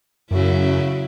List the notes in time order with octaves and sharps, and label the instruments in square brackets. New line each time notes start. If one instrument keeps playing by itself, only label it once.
[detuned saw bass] F#2 [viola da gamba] C#3 F#3 E4